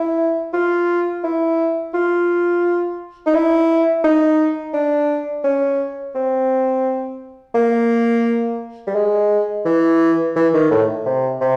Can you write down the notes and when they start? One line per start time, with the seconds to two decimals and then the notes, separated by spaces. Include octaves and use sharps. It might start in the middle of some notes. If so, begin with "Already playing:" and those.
Already playing: E4
0.54 F4
1.24 E4
1.94 F4
3.26 D#4
3.35 E4
4.04 D#4
4.74 D4
5.44 C#4
6.15 C4
7.55 A#3
8.87 G3
8.95 G#3
9.66 E3
10.36 E3
10.54 D#3
10.71 A2
11.06 C3
11.41 C3